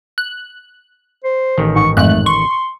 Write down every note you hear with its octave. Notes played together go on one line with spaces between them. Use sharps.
F#6
C5
A1 D#3
G#2 C#6
F2 G#2 A3 F#6
C6 C#6